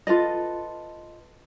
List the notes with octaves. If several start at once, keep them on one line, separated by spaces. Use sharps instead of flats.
F4 A4 B4 D#5